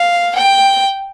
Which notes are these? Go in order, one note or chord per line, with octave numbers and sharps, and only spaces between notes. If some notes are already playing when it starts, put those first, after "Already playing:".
Already playing: F5
G5